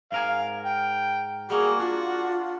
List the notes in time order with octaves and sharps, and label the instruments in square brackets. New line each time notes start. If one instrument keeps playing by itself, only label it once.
[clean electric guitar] G#2 A#4 G#5 [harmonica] F5
[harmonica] G5
[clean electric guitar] G3 A#3 [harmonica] F#4 [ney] G#4
[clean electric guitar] D4 [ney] F4